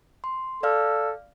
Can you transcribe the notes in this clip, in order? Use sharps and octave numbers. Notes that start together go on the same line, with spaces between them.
C6
A4 D5 F5 F6